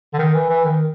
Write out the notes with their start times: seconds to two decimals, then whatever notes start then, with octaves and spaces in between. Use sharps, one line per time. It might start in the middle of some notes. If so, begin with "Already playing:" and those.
0.14 D3
0.19 D#3
0.35 E3
0.49 E3
0.65 D#3